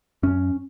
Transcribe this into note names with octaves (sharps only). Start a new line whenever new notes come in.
F#2 C#4